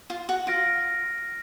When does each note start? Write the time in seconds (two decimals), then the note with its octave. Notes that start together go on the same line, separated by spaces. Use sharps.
0.10 F4
0.29 F#4
0.47 F4 F6 A#6 D7